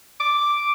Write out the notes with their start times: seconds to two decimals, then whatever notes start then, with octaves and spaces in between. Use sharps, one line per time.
0.20 D6